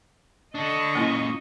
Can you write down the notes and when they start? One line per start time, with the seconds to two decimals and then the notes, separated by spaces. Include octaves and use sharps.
0.55 D4 A4 D#5 C#6
0.95 C#2 A#2 A#3 C#4 E4